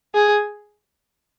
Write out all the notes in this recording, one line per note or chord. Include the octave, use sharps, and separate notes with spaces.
G#4